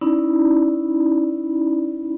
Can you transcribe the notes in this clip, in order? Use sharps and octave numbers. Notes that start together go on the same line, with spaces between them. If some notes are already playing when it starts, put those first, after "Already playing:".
C#4 D#4 E4 D5 B5